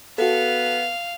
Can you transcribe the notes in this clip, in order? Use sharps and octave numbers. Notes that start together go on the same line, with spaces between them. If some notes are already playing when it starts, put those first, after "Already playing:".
B3 F#4 A4 F5